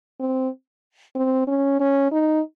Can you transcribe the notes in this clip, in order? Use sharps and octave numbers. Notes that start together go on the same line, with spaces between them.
C4
C4
C#4
C#4
D#4